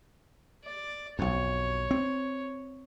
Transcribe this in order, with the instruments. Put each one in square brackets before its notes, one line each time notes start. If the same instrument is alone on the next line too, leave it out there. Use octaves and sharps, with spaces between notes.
[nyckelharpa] D5
[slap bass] B1 F2 [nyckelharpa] C#5
[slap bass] C4